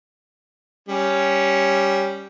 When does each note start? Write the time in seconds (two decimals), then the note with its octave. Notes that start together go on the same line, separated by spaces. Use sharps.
0.89 G3 C#4